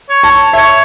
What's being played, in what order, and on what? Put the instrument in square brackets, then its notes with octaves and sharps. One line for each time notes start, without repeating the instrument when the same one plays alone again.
[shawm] C#5
[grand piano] A5
[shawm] C#5 [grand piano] E5